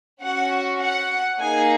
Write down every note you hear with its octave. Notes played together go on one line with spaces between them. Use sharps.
C#4 F#4 F#5
F#5
A#3 D#4 G#4 G#5